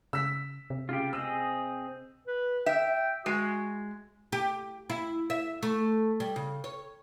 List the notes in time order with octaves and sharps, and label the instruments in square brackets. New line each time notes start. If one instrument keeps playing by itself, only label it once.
[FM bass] C#3 [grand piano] E6 B6
[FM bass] C3
[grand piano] C#3 [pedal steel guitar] F4 G4
[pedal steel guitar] C4 G#4 D#5 [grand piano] E6
[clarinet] B4
[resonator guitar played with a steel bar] E5 [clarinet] G5
[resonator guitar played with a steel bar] G#3 [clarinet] F#4
[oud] G4
E4
E5
A3
G3
C#3
C#5